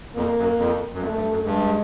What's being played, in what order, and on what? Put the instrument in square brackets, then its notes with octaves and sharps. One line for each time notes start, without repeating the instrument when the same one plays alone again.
[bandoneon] F2 [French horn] A#3
[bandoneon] F#2
F2
F#2
[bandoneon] F2 [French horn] A3
[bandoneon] G2
F#2
[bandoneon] G2 [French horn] G#3